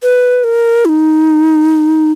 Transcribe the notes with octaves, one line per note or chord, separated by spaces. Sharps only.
B4
A#4
E4
D#4